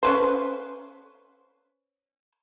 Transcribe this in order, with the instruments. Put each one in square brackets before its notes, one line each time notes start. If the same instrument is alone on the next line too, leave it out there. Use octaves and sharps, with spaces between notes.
[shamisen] C#4 B4 C5